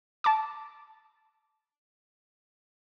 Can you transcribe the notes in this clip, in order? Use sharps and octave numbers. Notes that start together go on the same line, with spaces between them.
A5 D6